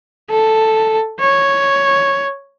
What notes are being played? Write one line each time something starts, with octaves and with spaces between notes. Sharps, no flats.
A4
C#5